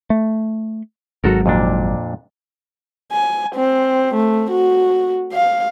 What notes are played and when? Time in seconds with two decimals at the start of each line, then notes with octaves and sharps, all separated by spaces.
0.10 A3
1.24 G#1 G#2 F#3 F#4 A4 A#4
1.46 F2 A#2 D4
3.12 G#5
3.55 C4
4.15 A3
4.51 F#4
5.33 F5